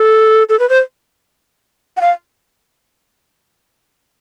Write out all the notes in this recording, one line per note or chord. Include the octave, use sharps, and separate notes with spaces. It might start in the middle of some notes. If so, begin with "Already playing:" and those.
Already playing: A4
A4
B4
C5
F#5
F5